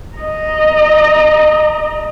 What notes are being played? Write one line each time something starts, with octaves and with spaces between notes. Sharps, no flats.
D#5 A#5